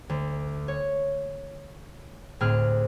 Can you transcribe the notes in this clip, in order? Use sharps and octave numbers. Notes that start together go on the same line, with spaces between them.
D2
C#5
D2 A2 C4 G#4 F6 F#6